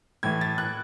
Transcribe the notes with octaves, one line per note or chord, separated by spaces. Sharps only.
A2 E3 A3 G#6
A6
F#6